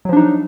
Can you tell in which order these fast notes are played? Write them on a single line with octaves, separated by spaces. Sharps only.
F#3 F3 D4 D#4